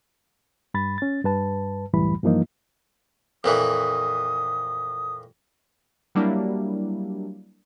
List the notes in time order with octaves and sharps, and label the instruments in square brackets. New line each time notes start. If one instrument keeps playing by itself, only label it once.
[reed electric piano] G2 B5 A6
C#4 A6
G2 B4 A5
C2 F#2 A2 E3 G3 B5
G2 E3 F3 A#3 D#4 F4
[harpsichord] F2 A#2 E3 [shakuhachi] D#6
[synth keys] F#3 G3 A#3 D4 E4